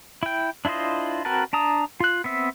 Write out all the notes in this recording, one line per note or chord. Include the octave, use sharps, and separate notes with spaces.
E4 G5
D4 E4 F4 C5 D#5
C4 F#4 A#4 B4 A5
D4 A5 A#5 D#6
F4 F#6
B3 C4 E5